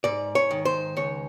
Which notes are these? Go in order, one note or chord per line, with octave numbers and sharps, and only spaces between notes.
G#2 D5
C#5
D#3
C5
C#2 C#5